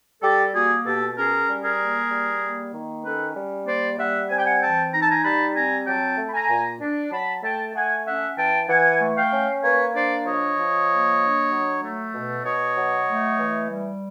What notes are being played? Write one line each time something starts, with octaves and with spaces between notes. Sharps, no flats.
G3 G4 A4
A#3 F#4 G#4
B2 G4 A4
C#4 G#4 A#4
G3
G#4 A#4
A#3
G3
A#3
D#3
C#4 A4 B4
G3
A#3 C5 D5
G3 E5 F#5
C4 G#5
G5
F#5 G#5
E3 G5 A5
D#4 A#5
A5
G#5 A#5
G3 A5 B5
C4 G#5 A#5
F#3 G5 A5
A3
B5
G#5 A#5
A#2
D4
F#3 A5 B5
A3 G5 A5
A3 F#5 G#5
C#4 E5 F#5
E3 G5 A5
E3 F#5 G#5
A3
F5 G5
C#4
A#3 B4 C#5
D4 C5 D5
F3 C#5 D#5
F3
A#3
D4
F#3
A3
B2
B2 C#5 D#5
F#3
A3
E3
G3